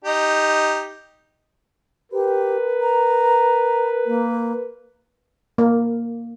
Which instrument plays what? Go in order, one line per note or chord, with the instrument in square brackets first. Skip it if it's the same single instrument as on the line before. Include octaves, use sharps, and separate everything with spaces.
[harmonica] D#4 G4
[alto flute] G4 [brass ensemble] A#4 B4
[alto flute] A#5
A#3
[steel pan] A#3